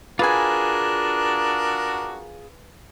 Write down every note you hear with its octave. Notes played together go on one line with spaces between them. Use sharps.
D4 F4 F#4 G#4 A#4 B4 G#5